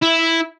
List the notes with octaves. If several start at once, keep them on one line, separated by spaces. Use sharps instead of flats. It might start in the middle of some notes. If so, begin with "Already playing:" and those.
E4